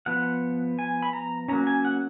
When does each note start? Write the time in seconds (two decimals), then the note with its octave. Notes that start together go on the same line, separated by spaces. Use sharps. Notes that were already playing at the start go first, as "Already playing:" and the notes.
0.06 F3 B3 F#5
0.79 G#5
1.03 B5
1.13 A#5
1.48 F#3 A#3 C#4 A#5
1.67 G#5
1.85 F#5